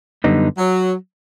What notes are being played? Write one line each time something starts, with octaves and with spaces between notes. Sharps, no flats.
F#2 D3 G3 B3 D#4
F#3